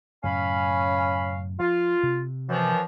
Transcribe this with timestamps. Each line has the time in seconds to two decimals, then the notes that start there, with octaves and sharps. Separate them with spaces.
0.24 F#2 A2 C#3 C#4 F5 B5
1.60 F3 F4
2.03 C3
2.49 F#2 E3 F3